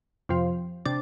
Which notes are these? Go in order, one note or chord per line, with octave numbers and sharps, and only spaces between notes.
F2 C3 F3
C3 D4